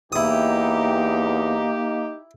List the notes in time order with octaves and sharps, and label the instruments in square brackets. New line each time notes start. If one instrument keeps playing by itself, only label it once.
[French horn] E2 [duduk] A#3 [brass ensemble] D#4 G4 [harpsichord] E4 D#6